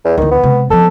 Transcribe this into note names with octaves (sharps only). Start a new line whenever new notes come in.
E2
D2 D#3 E3
B3
C3 G#3
F3 B3 A4